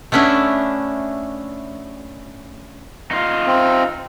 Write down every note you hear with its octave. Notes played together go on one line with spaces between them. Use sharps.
A3 B3 C#4 D4 E4
D#4 F4
C4